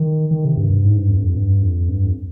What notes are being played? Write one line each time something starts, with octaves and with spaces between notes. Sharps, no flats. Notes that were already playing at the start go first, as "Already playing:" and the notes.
Already playing: D#3
D#3
C3
G2
G2
G#2
G2
F2
G2
F2
G2
F2
G2
F2